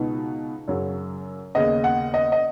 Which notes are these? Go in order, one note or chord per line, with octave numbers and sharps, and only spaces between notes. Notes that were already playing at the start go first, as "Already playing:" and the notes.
Already playing: C#2 B2 B3 D#4
F#2 C#3 F#3
D#2 C#3 B3 D#5
F#5
D#5
D#5